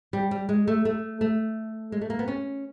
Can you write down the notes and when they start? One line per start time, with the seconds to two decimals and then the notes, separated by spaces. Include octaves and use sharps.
0.13 G3
0.31 G3
0.49 G#3
0.67 A3
0.85 A3
1.21 A3
1.92 G#3
2.01 A3
2.10 A#3
2.19 B3
2.28 C#4